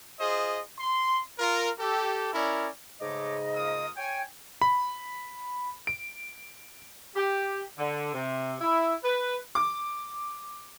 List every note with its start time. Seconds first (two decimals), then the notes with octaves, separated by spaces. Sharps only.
0.18 F4 G#4 C5 D#5
0.78 C6
1.38 F4 A#4
1.79 G4 A4
2.32 C#4 E4 A#4 D5
3.01 G#2 C#3 A3 C#5 D#5 D6
3.55 A#3 F4 D#6
3.96 C#5 G5 G#5
4.62 B5
5.87 D7
7.15 G4
7.78 D3
8.13 C3
8.61 E4
9.04 B4
9.55 D6